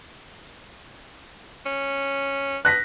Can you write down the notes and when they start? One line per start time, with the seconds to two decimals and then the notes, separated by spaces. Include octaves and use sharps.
1.66 C#4
2.65 B3 F#6 A#6 B6